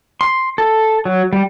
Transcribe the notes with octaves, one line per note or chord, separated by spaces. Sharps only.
C6
A4
F#3
G3